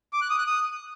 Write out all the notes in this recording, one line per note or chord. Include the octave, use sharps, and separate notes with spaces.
D6
F#6
D#6
F#6
D#6